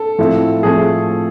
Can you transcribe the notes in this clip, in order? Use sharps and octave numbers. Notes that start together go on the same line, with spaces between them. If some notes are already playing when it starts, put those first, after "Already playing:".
Already playing: A4
A2 F3 A3 C4 E4
A2 F3 A3 C4 G#4